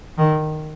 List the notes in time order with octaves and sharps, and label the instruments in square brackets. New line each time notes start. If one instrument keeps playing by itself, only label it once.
[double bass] D#3